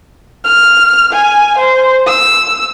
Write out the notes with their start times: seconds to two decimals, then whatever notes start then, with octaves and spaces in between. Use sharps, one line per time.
0.44 F6
1.13 G#5
1.58 C5
2.07 E6